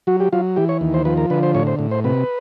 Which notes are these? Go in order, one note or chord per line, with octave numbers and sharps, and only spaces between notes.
F#3 F#4
G4
F#3 F4
E3 G4
C#5
D#2
C5
F3 B4
A#4
D3 B4
C5
A2 C#5
C5
A2
C5
C3 B4